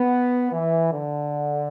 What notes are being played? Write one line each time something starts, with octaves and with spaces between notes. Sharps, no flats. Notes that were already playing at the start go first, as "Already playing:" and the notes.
Already playing: B3
E3
D3